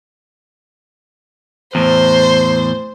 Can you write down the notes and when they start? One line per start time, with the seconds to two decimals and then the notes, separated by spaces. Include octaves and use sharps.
1.75 E2 A2 C5